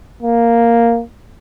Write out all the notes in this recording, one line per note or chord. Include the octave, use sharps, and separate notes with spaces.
A#3